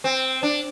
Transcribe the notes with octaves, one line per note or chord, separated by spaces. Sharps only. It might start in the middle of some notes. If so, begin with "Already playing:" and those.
C4
D4